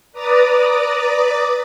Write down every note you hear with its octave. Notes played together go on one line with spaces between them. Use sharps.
B4 D5 A#5 D6 D#6 A6